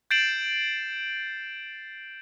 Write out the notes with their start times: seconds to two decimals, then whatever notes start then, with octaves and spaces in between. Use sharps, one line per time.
0.11 G6 A6 C7 D7 E7 F#7